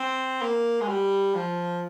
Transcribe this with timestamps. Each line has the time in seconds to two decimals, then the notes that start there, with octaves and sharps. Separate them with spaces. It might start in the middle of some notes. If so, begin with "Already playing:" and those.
Already playing: C4
0.42 A#3
0.81 G#3
0.89 G3
1.35 F3